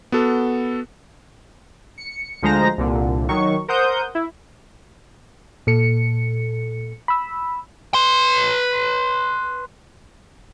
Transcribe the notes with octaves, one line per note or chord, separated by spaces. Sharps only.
B3 F#4 A4
C#7
D2 F3 G#3 C5 A#5 A#6
C2 A#2 D3
D#3 F#3 C#6
A#4 C5 F#5 D#6 G6
E4
A#2 A4 C#7
B5 E6
B4 C6